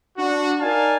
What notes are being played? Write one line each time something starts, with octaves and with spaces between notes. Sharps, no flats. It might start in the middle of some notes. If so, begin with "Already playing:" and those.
D4 F#4
D#4 A#4 D5 F5 G#5 A5